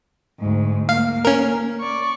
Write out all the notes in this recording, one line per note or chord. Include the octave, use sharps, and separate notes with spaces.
D2 G#2
A#3 F5
C#4 A#4
D5 C#6